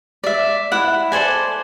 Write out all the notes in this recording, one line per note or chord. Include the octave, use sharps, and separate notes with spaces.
D5 E5
E4 F#5
A4 C5 D5 G#5